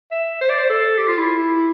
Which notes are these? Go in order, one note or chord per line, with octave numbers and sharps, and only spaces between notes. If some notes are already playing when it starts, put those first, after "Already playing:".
E5
C5
D5
C5
A4
G4
F4
E4